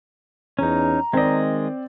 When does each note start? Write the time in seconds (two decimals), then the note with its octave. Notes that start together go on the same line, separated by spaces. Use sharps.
0.59 E2 C#4 D#4 A#5
1.13 D#3 G#3 C4 D5 D#5